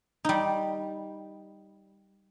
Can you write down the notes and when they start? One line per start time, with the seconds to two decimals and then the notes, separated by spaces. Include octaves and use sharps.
0.25 G3 D#4